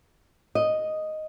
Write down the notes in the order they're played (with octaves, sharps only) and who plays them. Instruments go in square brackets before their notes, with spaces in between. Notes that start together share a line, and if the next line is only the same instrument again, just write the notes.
[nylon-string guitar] D#5